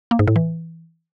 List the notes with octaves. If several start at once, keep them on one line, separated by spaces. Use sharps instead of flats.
A#3
G#2
A2
E3